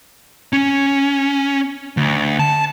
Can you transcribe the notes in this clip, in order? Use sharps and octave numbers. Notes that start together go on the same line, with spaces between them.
C#4
D2
A5